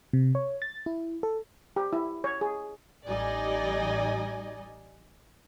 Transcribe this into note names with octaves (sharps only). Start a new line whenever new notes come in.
C3
C#5
A6
E4
A4
G4
E4
C#5
G#4
A1 G3 D#4 D5 D#5 G#5